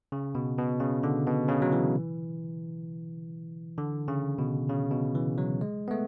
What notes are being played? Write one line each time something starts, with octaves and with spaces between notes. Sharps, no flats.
C#3
B2
B2
C#3
D3
B2
C#3
F#3
E3
D3
C#3
B2
C#3
B2
E3
F#3
G#3
B3
A3